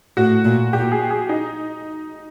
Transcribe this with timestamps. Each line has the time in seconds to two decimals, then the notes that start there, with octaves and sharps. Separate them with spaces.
0.17 A2 F#4
0.45 A#2
0.73 A#2 G4
0.92 G#4
1.11 G#4
1.29 D#4